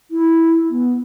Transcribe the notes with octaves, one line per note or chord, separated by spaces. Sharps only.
E4
B3